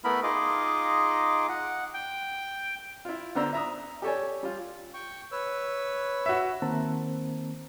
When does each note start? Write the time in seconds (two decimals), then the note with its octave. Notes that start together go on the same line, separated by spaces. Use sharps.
0.04 A3 B3 E4 A#4 B5
0.23 D#4 F4 G#4 D#5 D6
1.49 F#5
1.94 G5
3.05 E4 F4
3.35 D3 B3 C5 D5 A#5 E6
3.53 E5 A#5 D#6
4.02 G4 A4 C#5 D5 G#5
4.43 G3 F4
4.94 G5 C#6
5.32 B4 C#5 E6
6.26 F#4 E5
6.62 D#3 A#3 C4 C5 A5 A#5